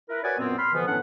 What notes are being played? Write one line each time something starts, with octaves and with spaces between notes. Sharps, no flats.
E4 A#4 B4
F#4 B4 C#5 D5 F#5 G#5
F#2 A#2 B3 C4
B5 C6 F6
B2 D3 E3 F3 B3
A2 B3 C#4 D4 F#5